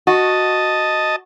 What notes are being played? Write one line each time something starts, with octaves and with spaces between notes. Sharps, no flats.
F#4 D#5 A5